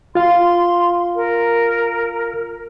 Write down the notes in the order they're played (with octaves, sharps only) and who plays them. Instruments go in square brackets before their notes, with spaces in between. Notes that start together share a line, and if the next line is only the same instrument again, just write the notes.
[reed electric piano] F4 F5 [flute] C6
[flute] A#4